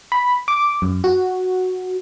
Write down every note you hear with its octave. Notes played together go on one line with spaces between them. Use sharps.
B5
D6
F#2
F#4